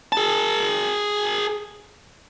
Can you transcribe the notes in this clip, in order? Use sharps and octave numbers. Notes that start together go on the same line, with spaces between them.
G#4 A5